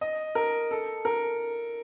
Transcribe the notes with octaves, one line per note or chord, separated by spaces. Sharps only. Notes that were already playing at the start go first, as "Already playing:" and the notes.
D#5
A#4
A4
A#4